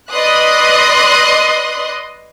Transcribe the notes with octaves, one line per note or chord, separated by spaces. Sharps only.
B4 D5 D#5 C6 D#6 F#6